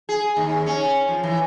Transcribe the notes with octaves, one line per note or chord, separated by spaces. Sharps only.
G#4
D#2
C#4
F3
E3